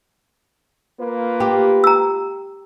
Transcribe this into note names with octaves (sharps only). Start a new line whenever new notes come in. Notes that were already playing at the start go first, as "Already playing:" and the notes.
A#3 F4 B4
G4
A#5 E6